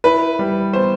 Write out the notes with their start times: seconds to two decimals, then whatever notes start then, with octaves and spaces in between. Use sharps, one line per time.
0.04 E4 B4
0.39 G3
0.73 B3 C5